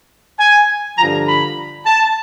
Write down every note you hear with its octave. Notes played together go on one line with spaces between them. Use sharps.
G#5
G2 D3 F3 A#5
B5
A5